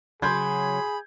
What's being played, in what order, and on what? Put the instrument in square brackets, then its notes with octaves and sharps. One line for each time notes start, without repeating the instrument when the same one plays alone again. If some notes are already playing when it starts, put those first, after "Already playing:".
[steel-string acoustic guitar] C#3 F#3 [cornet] G#4 [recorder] B5 [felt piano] C6 G6 G#6